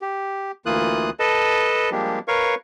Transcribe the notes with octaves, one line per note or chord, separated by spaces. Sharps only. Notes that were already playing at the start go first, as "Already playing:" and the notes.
G4
D2 E3 A#3 F4 D#6 F#6
A4 B4 D#5 A5
F3 G3 G#3 A#3 D4 G4
A#4 B4 C#5 F5 C#6